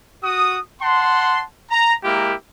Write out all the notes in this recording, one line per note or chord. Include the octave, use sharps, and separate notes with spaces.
F#4 D#6
F#5 A5 C6
A#5
G#3 A#3 E4 G4 A#4